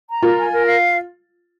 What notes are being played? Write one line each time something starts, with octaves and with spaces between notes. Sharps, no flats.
A#5
F4 A#4
G#5
A#4
F5